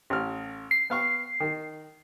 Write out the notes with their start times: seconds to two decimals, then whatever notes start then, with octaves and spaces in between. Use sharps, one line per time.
0.10 A1 F6
0.71 C7
0.90 B3 F5 C#6
1.40 D#3